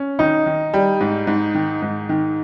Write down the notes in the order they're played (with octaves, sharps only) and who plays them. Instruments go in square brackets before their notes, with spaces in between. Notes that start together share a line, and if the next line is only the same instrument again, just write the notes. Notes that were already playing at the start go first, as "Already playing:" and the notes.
Already playing: [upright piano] C#4
[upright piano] D#3 [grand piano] D#4
[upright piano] D#3
G3
G#2
G#2
D#3
G#2
D#3